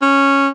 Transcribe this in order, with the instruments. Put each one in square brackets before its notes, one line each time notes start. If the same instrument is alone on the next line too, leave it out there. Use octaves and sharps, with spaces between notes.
[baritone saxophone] C#4